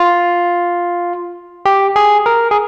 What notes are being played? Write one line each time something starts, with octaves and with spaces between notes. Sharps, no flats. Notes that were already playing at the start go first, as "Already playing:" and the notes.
Already playing: F4
G4
G#4
A#4
G#4